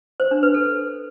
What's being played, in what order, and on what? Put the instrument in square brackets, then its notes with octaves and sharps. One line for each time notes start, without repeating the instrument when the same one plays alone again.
[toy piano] C5
D4
B4
A4